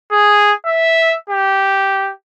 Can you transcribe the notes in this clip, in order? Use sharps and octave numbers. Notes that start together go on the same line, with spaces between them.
G#4
E5
G4